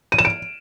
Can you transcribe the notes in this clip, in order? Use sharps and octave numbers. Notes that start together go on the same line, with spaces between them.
D#7
E7
D7